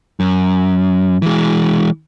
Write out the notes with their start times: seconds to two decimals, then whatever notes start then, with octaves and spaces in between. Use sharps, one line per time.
0.20 F#2
1.22 E3 G#3